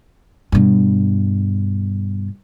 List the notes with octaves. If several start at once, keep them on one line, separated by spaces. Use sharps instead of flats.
G2 B2